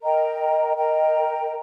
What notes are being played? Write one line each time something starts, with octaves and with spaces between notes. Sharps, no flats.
A#4 D#5 G5 A#5
A#4 D#5 G5 A#5